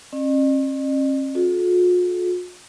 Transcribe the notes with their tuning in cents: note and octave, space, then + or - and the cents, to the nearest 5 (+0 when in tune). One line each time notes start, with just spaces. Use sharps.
C#4 -45 D#5 -45
F4 +45 A4 -40